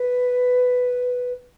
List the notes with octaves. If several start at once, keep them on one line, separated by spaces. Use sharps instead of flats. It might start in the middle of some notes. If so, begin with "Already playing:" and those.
Already playing: B4